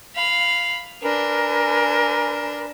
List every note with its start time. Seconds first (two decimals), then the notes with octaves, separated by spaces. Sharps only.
0.16 F5 B5
1.02 D4 A#4 B4 G#5